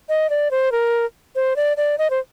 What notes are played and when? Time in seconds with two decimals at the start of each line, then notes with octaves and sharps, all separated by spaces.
0.09 D#5
0.30 D5
0.51 C5
0.72 A#4
1.35 C5
1.56 D5
1.77 D5
1.98 D#5
2.10 C5